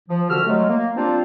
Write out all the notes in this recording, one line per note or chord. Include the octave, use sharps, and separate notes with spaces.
F3
C2 D3 F#4 G4 E6 F6
F#3 G#3 A3
A#3
G3 A#3 C4 D4 F4 C5